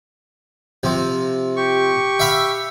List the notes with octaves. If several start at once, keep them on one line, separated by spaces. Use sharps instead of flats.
C3 F3
G4 C#6
E5 F5 B5